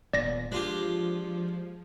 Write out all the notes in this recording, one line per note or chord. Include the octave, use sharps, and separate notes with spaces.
D#1 A#2 B3 D5 A#6
F3 G#3 D4 F4 G4